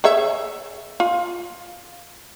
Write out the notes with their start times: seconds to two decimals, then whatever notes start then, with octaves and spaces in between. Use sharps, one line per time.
0.04 G#4 C#5 E5
1.00 F4